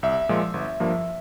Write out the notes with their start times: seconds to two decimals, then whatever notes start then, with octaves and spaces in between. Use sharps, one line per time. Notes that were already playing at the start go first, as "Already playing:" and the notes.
0.03 C2 E5
0.29 A#2 F3 G#3
0.54 G1
0.80 G2 F3 A#3